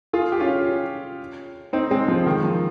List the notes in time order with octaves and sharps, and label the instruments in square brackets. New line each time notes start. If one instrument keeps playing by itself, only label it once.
[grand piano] F4 G#4
G4
C#4 F4
C4 D#4
G#3 C4
F3
D#3
F3